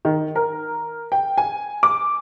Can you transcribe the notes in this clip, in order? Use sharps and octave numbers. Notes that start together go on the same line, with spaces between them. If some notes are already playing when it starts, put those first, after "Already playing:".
D#3
A#4
G5
G#5
D6